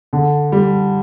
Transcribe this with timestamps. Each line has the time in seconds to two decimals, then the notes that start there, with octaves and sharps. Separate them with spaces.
0.13 D3
0.52 G3